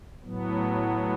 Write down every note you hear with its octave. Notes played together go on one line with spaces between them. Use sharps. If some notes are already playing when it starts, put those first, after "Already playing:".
A2 F#3 B3